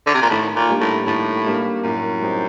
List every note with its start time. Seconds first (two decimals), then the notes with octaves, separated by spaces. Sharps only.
0.06 D3
0.14 C3
0.22 A#2
0.30 A2 D#3
0.56 A#2
0.69 G3 A#3 D4 G4
0.81 A2
1.06 A2 D#3
1.45 G3 A#3 D4 G4
1.83 F#2 A2
2.22 G3 C4 D#4 G4